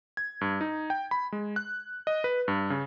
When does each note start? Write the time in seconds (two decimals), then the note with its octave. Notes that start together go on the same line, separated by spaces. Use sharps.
0.17 G#6
0.41 G2
0.61 D#4
0.90 G5
1.11 B5
1.32 G#3
1.56 F#6
2.07 D#5
2.24 B4
2.48 G2
2.70 C#3